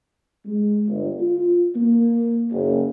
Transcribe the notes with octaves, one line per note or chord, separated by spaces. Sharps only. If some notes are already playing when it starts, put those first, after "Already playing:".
G#3
G1
F4
A#3
F#1